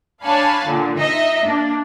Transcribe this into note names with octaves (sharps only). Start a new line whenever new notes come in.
D4 C#5 F5 G#5 A5 B5
A#2 D3
D#4 D#5 E5
A#3 D4